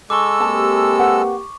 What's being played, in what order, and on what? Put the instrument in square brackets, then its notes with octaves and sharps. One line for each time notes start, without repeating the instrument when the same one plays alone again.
[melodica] G#3 A4 E6 [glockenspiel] C#6 D6
[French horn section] A#3 C4 G4 [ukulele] A5
[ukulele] B4 F#5